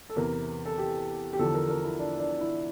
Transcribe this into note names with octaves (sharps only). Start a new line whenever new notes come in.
A4
E2 C3 E3 A#4
A4
G4
G4
E2 D3 F3 A4
A#4
A#4
E4
D4
D4
E4